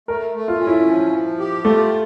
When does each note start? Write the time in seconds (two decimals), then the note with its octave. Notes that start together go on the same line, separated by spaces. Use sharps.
0.08 A3 A#4
0.35 A3
0.48 F4
0.60 C#4
0.67 E4
0.86 F3
1.13 F3
1.39 G4
1.65 A3 F4